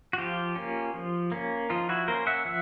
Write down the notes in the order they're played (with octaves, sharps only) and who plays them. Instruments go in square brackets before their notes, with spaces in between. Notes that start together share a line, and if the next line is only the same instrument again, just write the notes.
[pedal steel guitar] F#4
F3 F4 G4
A#3 C#4
F3
A#3 C#4
F3 D#4 F4
E4 F#4
A#3 C#4 A#4 C5
E5 F#5
F3 E5 F#5